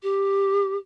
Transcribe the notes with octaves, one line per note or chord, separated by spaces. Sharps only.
G4